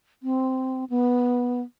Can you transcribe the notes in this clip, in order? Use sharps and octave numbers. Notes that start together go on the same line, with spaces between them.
C4
B3